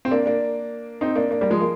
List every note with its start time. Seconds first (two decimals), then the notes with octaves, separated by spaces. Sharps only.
0.05 C4
0.11 A#3 D4
0.26 A#3 D4
1.01 C4 D#4
1.16 A#3 D4
1.31 A#3 D4
1.41 G3 A#3
1.51 F3 G#3
1.61 A#3